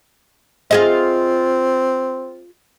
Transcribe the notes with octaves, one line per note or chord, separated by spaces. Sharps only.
C4 F4 G#4 D#5